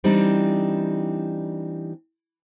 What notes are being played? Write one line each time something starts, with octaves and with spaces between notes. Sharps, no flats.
E3 G3 C4 D4 D#4